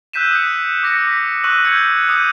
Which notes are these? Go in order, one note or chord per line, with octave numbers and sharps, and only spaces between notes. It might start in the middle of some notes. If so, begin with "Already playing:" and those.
E6 F#6 G6 B6 D#7 E7
D#6 C#7
D6 A#6 B6 C#7
C#6 D#6 E6 F#6 D#7 F#7
E6 G6 G#6 C#7 D#7
D6 D#6 G6 D#7